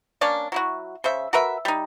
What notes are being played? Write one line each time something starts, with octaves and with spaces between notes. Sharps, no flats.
A#3 C#4 D4 D5
F#3 E4 F#4
C#3 C5 E5
F#4 A#4 B4 E5
G3 D#4